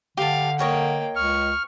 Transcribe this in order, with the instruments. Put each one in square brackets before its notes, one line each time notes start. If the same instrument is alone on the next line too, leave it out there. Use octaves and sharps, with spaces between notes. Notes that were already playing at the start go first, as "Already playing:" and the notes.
[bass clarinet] D3 [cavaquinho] G4 A5 [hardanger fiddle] F5
[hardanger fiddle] A#3 G5 [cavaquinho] A#4 C#5 D#5
[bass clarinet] C#2 [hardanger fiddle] C#6 [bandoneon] F6